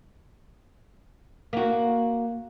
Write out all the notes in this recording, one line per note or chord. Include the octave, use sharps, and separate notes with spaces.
A#3 F#4